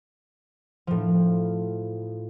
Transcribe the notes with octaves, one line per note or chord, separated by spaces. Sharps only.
A2 F3